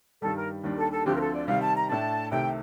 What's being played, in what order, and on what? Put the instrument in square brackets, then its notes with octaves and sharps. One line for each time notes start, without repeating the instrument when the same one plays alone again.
[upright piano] G2 D#3 G3 [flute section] A4
[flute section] A#4
[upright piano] D#2 D#3 G3 D4
[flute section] A4
A4
[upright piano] D2 D3 F3 C4 [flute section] G4
[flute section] A#4
A4
D5
[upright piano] C3 D#3 G3 [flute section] F5
[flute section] A5
A#5
[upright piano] A2 A3 D4 [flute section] A5
[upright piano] C2 C3 D#3 A3 [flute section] G5